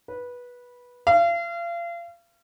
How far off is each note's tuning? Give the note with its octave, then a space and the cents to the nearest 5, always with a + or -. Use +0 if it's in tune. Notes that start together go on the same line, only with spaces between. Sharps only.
B4 -15
F5 -35